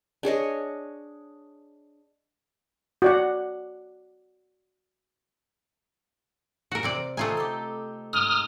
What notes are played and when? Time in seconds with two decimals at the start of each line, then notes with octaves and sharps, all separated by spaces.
0.23 D4 G#4 C#5 D#5
3.02 F#4 D5 F#5
6.71 F#4 A#4
6.83 C3 C4 D5
7.17 A3 C4 D#4 F4 G#5
7.37 G4 A4
8.13 G#2 D#6 F6